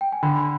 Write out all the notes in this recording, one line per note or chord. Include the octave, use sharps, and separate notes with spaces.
G5
G#5
D3 B5